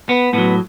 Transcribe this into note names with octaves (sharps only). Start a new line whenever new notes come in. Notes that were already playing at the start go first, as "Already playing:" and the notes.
B3
A2 F#3 B3